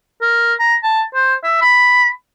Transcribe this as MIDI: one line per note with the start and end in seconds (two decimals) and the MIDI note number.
0.21 0.54 70
0.59 0.75 82
0.83 1.03 81
1.14 1.35 72
1.44 1.57 76
1.61 2.10 83